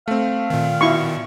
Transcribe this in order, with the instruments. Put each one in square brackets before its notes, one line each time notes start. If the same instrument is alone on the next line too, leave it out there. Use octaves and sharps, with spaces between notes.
[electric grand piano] A3 C4 [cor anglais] F5
[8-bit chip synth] A#2 D#3
[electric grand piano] B2 [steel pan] E4 C#6